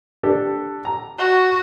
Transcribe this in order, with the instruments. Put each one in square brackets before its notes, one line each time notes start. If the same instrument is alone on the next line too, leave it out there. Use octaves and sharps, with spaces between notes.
[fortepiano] D4 G4 A4
A#5
[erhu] F#4